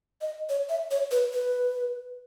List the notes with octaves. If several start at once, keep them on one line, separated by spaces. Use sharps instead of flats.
D#5
C#5
E5
C#5
B4
B4